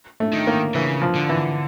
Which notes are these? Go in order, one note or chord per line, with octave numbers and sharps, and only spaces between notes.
A3
D#3
A#3
C#3 E3
F3
D3
E3